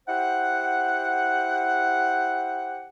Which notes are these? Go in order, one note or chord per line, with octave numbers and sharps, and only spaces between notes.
E4 G4 C5 F#5